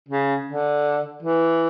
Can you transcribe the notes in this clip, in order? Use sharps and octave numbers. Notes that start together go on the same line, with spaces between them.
C#3
D3
E3